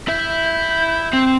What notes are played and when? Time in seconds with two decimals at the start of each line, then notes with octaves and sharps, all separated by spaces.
0.08 E4 E5 G6
1.13 C4